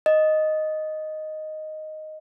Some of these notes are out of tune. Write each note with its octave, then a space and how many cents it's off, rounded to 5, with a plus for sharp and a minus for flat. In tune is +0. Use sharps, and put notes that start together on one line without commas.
D#5 +0